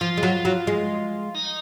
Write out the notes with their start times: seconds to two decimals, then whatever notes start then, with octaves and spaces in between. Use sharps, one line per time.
0.01 F3 F4
0.17 G#3
0.23 F#3
0.45 F#3
0.67 G#3
1.35 D#4